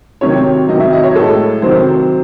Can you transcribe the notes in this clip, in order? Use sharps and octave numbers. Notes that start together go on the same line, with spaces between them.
C3 D#3 F#3 C#5
C3 D#3 F#3 D#5
E5
D#5
C#5
A2 G#3 A4
C3 D#3 F#3 C5